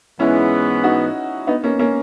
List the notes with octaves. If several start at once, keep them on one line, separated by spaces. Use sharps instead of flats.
G#2 E3 G#3 B3 C#4 E4
D#4 F#4
B3 D#4
A#3 C#4
A#3 C#4